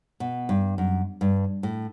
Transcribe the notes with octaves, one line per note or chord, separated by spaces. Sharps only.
B2
G2
F#2
G2
A2